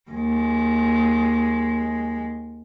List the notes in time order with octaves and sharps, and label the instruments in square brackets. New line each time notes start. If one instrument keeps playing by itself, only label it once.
[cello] D#2 G#3